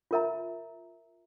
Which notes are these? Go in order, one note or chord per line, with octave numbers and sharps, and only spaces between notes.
F4 A#4 E5 A#5